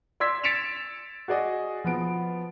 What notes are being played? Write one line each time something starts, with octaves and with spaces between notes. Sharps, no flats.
D5 C6 E6 G#6 B6
A6 B6 C#7 D7 E7 F7
F#4 G#4 D5 D#5
F3 B3 D7